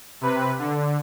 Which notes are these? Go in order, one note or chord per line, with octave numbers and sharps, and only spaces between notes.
C3 B4
D3